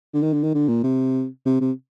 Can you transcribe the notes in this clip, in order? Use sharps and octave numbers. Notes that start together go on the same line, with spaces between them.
D3
D#3
D3
D#3
D3
A#2
C3
C3
C3